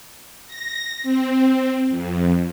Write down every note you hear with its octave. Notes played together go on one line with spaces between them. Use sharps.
A#6
C4
F2